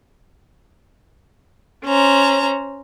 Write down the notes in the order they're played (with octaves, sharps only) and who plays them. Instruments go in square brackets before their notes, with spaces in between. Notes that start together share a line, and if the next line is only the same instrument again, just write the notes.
[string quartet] C#4 C5 A#5